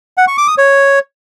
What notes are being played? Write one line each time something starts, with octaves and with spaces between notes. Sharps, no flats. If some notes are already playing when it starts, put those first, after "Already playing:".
F#5
C#6
D6
D#6
C#5